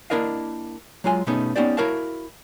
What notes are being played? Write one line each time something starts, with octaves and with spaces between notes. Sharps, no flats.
A#3 D4 E4 A#4 D#5 F5
F#3 G#3 F4 G#5
B2 A3 B3 C#4 D#4 G#4
B3 C#4 D#4 G4 C5 D5
E4 F#4 A#4 C#5 F5 A5